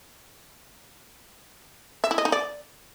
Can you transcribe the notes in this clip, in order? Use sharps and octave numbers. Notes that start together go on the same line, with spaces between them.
E5
E4
D#5
D#4
D5